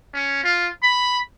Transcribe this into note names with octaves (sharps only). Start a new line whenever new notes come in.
C#4
F4
B5